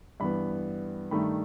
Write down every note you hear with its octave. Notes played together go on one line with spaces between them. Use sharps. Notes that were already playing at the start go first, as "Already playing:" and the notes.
G2 E3 B3 B5
G2 D#3 A3 D#4 B5